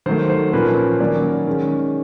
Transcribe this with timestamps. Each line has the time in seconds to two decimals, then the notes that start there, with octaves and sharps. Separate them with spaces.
0.06 D#3 F#3 A3 C5
0.30 C5
0.53 A#2 F3 A#3 C#4 B4
1.00 D#3 F#3 A#3 C#4 D5
1.47 D#3 G#3 C#4